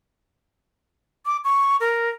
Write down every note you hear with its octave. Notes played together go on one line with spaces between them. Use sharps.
D6
C#6
A#4